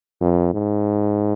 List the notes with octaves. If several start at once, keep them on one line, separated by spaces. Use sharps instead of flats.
F2
G#2